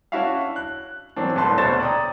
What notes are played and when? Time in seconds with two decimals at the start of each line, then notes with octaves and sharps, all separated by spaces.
0.12 C#4 D4 E4 F#4 E5 F5
0.56 F#6
1.16 E3 F#3 C4 D4
1.35 D#1 C2 A2 B4 A5 C6
1.58 D2 B2 C5 C#5 A6 E7
1.80 D5 G5 A#5 D#6